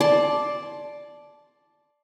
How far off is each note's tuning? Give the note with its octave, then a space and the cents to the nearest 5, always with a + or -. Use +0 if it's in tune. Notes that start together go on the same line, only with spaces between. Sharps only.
D5 +0 A5 -15 C6 +10